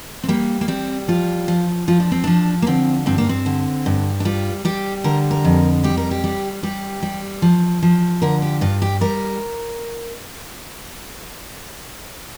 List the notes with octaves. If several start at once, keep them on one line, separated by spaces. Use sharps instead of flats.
C4
G3 A#3
A#3
G3 C4
F3 F4
F3
F3 F4
D4
C4
F3 D4
A#3
D3 C4
G2 C4
A#3
C4
D3
G2
D4
G3 F4
G3 G4
D3 A#4
A#4
F2
G3 G4
A#4
G4
G3
G3 G4
G3
F3
F3
D3 A#4
G4
G2 F4
G4
G3 A#4